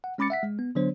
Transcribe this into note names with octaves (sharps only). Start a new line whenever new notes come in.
F#5
G#3 C#4 B5 D6 A6 C#7
E5 F#5 B6
G#3
B3
D3 F#3 B3 D4 C5 C#5